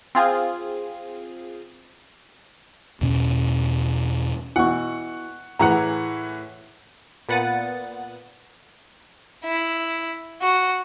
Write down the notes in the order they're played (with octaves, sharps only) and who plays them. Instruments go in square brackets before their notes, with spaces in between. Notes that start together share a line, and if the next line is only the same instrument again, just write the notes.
[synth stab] C4 F4 G#4
[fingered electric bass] E2 B2 C#4
[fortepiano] B2 E3 [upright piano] F#5 C#6
[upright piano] A2 E3 F#5 [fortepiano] G#4 A#5
[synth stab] A#2 B3 F#5 A6 D#7
[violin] E4
F#4